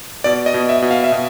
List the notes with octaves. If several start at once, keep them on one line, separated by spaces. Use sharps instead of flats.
B2 D5
D#5
B2
E5
B2
F5
E5
B2